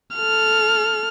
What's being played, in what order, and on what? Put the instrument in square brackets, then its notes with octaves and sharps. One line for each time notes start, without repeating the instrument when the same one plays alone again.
[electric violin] A4 F6